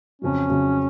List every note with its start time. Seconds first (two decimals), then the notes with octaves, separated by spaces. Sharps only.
0.21 F2 C#3 F#3 C#4
0.49 F2 C#3 F#3